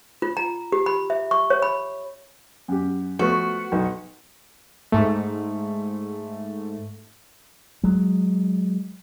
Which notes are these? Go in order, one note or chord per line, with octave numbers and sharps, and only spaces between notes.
F4
A#5
G4
B5
E5
C#6
C#5
B5
F#2 G4
F3 A3 B3 F#4
B1
G#2 A3
F#3 G#3